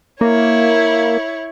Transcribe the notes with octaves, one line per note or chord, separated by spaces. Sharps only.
A#3 E4 C#5